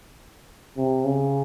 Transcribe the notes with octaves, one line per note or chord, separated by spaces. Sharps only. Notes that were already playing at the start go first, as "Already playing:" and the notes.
C3
C#3